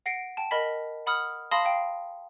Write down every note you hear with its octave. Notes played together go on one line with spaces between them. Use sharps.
F#5 A#6 C7 D7
G5 A5
A#4 D#5 B5 B6
F#5 B5 D#6 F6
F5 A5 B5 C6 D#6 A#6
F5 G5